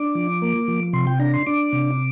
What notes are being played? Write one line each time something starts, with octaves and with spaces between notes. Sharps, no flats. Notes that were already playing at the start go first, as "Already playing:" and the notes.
Already playing: D4 D6
F3
A#3
F3
C3 C6
G5
D4 A#5
C6
D4 D6
C3